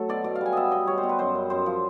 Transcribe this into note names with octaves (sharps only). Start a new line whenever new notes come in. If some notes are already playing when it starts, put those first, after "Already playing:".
Already playing: F#3 A3 A4
B2 D5
B2 D5
F5
G3 G#5
B3 D#5 E5
B3 D#5
G3 C#5
C5
B2
B4
F#2 C5
F#2
F#2 C5
F3